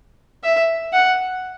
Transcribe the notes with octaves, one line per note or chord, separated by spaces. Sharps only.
E5
F#5